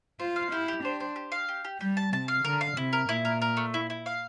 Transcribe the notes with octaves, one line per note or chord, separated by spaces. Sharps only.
F4 C5
F5
E4 G4
G4
D4 C5
C5
G4
F5
G4
G4
G3 G4
A5
C3 A5
F5
D3 A#4
F5
C3 E4
A#4
A#2 E4
A#4
A#4
A3
E4
E4
F5